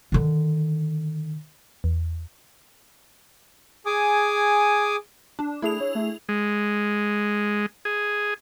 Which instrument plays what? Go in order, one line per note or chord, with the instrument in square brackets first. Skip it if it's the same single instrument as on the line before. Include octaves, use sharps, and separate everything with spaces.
[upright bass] D3 D#3
[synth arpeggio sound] E2
[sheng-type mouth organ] G#4 G#5 D6 D#6
[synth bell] D4
[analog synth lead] A3 [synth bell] E4 G#4 F7
[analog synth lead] C#5
A3
[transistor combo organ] G#3
G#4